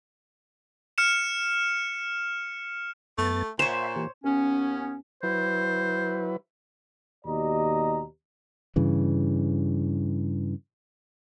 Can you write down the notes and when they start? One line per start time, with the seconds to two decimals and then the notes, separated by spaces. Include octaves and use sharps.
0.98 F6 C#7 E7
3.18 F#2 A3 B3 A6
3.59 A#2 C5 C#5 E5 F#5 B5 E7
3.96 E3 A#3 G4
4.24 D#2 B3 C#4
5.23 F#3 E4 B4 C5
7.25 D#2 B2 G4 D5 D#5 A#5
8.76 G2 C#3 E3